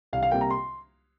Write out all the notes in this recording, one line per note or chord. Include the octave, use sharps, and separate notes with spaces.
C2 F5
F5
C3 G3 A#3 G5
A#5
C6